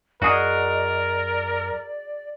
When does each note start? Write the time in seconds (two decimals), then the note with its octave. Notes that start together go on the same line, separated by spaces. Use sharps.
0.22 F#2 F#4 G#4 A#4 D5 D#5